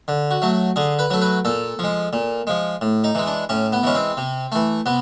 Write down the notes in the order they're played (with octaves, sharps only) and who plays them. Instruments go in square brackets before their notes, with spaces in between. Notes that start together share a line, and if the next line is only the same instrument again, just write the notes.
[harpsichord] D3
F#4
F#3 A3
D3 G#4
B4
F#3 A3
B4
A#2 A4
F3 G#3
A#2
F3 G#3
A2
D#4
E3 G#3
D4
A2 C#4
B3
E3 G#3 C#4
C4
C3
E3 A3
C3 B3